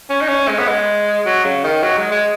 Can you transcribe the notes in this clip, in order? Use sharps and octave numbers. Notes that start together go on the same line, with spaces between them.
C#4
D#4
C#4
G#3
B3
G#3
F#3
C#3
D#3
F#3
G#3
G#3